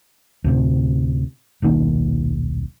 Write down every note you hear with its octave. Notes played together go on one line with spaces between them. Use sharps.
D2 A2 C3
D#1 B1 D#3 A#3